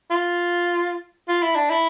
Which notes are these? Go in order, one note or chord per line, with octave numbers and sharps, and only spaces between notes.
F4
F4
E4
D4
E4